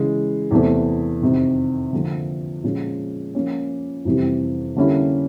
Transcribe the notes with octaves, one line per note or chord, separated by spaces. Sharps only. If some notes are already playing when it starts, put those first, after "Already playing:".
Already playing: C#3 E3 G#3
E2 C3 E3 A3 C4
F2 C3 D#3
D3 F3 A#3
A#2 F3 G#3 C#4
F3 A#3 C#4
F2 C3 E3 G3
D3 G3 A#3 C#4 E4